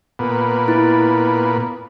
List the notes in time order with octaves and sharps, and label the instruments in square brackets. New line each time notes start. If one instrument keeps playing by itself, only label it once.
[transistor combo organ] A#2 B3
[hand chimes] E4